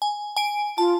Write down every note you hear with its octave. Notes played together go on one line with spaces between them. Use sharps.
G#5
G#5 D7
F4 A5